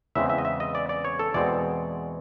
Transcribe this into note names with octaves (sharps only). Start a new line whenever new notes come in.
E2 C#3 E3 G#3 C4 E5
E5
D#5
E5
D#5
D5
D5
C#5
A4
E2 B2 G#3 C4 D5